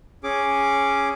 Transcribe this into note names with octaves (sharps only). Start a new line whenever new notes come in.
C#4 G#4 D6